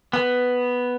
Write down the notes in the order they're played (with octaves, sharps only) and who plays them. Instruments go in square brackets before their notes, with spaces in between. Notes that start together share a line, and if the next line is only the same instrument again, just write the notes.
[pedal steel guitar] B3